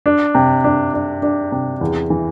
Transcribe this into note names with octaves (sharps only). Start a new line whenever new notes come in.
D4
C3
D4
D4
D4
C3
E2
E3